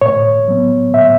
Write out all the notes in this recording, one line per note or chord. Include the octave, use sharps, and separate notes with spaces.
A2 C#5
F#3 B3
A2 E5